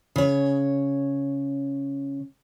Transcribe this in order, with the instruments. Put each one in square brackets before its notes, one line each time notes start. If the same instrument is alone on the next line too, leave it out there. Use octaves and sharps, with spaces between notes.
[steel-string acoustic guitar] C#3 C#5